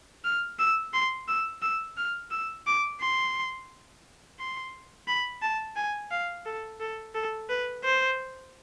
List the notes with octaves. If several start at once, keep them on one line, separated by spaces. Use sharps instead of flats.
F6
E6
C6
E6
E6
F6
E6
D6
C6
C6
B5
A5
G#5
F5
A4
A4
A4
B4
C5